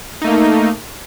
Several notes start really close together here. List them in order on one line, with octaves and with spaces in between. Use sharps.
D#4 A3 A#3